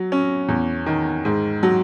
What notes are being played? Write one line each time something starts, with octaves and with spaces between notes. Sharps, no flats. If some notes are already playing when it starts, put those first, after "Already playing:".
Already playing: F#3
C#4
E2
D#3
G#2
F#3